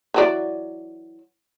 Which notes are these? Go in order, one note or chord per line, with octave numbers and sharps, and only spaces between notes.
E3 F#3 D5